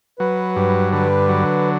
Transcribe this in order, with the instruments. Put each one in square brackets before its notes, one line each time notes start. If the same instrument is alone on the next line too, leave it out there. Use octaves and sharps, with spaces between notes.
[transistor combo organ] F#3 [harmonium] B4
[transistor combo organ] G2
[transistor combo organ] D3 [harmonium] B4
[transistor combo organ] F#3